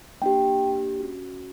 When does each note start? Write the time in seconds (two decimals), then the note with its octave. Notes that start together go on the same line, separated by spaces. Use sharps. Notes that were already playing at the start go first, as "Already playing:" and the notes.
0.22 A#3 D4 G4 G5
1.00 C#4 F#4